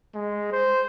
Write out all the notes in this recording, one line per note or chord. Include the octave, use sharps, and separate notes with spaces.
G#3
C5